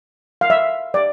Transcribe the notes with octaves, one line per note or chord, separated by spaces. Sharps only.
F5
E5
D5